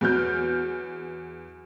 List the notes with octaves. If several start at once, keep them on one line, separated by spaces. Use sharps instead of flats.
E2 F#3 F6 G6